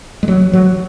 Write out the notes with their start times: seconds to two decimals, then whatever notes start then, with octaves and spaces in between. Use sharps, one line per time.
0.23 G#3
0.28 F#3
0.53 F#3